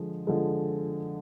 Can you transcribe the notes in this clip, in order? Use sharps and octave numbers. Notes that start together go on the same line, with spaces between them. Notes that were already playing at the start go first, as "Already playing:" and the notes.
Already playing: D3 F3 G#3
D3 F3 G#3